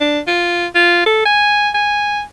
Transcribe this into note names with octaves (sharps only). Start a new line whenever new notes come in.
D4
F4
F4
A4
G#5
G#5